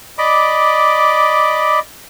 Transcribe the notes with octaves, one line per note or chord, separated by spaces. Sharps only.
D5 D#5 B5 D6